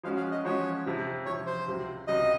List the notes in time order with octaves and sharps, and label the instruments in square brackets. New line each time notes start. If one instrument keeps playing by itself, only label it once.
[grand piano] F3 G#3 C#4 F#4 [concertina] F5
[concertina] F5
D#5
[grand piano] F3 G#3 C#4 F#4 [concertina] C#5
[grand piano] F2 C3 F3
[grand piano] F2 C3 F3 [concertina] C#5
[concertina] C5
[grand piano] C#2 C3 F#3 C4
[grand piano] C#2 C3 F#3 C4 [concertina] D#5